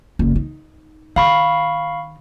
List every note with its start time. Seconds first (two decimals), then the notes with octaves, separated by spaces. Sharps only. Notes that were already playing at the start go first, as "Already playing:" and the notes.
0.19 F#1
0.35 D#4
1.16 D#3 F5 B5 C#6